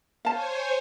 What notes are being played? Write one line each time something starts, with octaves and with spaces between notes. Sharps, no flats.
C5 C#5 F5 G#5 A5